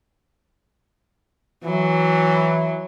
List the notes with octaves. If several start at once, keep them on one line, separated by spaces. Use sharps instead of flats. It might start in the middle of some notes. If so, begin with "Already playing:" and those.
E3 F#3